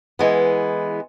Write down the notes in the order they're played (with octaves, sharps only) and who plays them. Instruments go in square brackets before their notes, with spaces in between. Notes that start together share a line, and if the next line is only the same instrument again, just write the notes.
[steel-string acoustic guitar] E3 G#3 B3